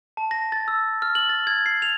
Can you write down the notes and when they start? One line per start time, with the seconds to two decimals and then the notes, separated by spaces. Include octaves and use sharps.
0.17 A5
0.31 A#6
0.52 A6
0.68 E6
1.02 F6
1.15 F#7
1.29 A6
1.47 G#6
1.66 C7
1.82 F7